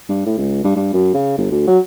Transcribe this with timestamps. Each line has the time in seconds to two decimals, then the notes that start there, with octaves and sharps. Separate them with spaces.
0.09 G2
0.26 A2
0.38 C#2
0.64 G2
0.76 G2
0.93 F#2
1.14 C#3
1.38 G1
1.51 D2
1.67 F#3